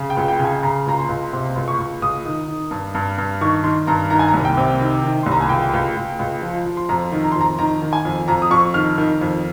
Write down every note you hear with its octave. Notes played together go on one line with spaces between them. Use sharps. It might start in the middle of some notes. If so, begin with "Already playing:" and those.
Already playing: C#3
G5
C#2
G5
C#3
G#5
C#3 A#5
C#2 A#5
C6
C#2
C3 C6
C#2
C#6
C#2
C#2 D#6
D#3
D#3
G2
G2
G2
D#3 C#6
D#3 C6
G2 A#5
D#3 A#5
G#5
A#5
C2
G5
C3
D#3
D#3
C2 C6
A#5
G#5
C#2 G5
C#2
C#2
C#2
F3
F3
C6
F2 A#5
D#3
A#5
C6
F2
A#5
D#3 A#5
D#3
G#5
F2
F2 A#5
D#6
F2 C#6
D#3 F6
D#3
F2